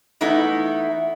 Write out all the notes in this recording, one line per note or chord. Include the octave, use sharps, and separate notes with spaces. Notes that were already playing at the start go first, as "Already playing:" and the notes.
E3 A3 B3 D#4 E4